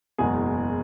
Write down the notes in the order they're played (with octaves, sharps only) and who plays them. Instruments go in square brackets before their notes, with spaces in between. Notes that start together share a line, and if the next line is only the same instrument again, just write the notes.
[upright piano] F#1 E2 B2 G#3 G#4 G#5